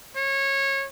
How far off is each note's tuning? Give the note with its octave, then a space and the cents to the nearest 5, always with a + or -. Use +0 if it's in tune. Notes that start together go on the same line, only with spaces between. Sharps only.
C#5 -20